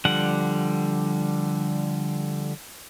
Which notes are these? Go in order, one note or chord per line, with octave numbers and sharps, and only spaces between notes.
D3 F3 G3 F#5